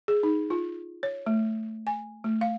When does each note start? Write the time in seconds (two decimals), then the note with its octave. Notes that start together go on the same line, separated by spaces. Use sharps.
0.08 G#4
0.23 D#4
0.50 F4
1.03 C#5
1.26 A3
1.87 G#5
2.24 A3
2.41 F5